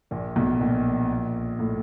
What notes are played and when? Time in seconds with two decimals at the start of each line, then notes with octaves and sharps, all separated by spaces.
0.11 A#1 A#2
0.36 B1 B2
0.61 A#1 A#2
1.59 A2